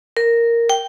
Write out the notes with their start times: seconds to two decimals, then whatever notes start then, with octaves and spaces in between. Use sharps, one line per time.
0.17 A#4
0.70 G5